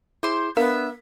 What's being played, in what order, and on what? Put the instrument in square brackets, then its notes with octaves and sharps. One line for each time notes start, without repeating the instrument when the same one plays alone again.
[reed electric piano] E4 G#4 D6 [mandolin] C5 C6
[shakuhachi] B3 [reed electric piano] D4 [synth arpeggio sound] A#4 F5 [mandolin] E5